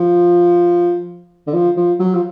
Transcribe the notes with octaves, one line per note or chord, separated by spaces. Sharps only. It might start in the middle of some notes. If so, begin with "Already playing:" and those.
Already playing: F3
D3
F3
F3
F#3
F3